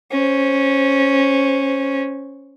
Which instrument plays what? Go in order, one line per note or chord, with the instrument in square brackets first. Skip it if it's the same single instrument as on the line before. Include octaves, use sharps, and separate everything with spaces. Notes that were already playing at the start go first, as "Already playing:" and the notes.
[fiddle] C#4 C5